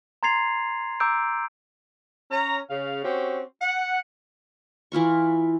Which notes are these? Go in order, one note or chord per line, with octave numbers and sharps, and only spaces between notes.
A#5 C6 G#6 A6 C7 F7
A#5 D6 E6 G6 D7
C#4 A#5
C#3 F5
C4 C#4 F#4 G4
F#5
E3 E4 F4 C#6